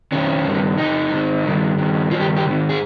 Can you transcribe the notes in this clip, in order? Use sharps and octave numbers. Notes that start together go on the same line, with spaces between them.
F2 D#3 C#4
G2 D#3
F2 C#3 D#4
G#2 D#3
G2 D#3
G2 D#3
G2 D#3 F4
G4
G4
G#2 D#3
G#4